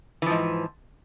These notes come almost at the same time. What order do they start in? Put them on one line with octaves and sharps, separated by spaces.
E3 F3 G#2